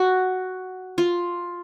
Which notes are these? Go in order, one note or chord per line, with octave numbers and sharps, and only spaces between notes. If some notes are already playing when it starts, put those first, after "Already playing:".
Already playing: F#4
F4